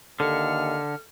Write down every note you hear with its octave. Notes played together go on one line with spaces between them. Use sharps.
D#2 D3 A4 F6 C#7